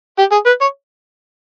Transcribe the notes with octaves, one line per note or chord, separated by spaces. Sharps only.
G4
G#4
B4
C#5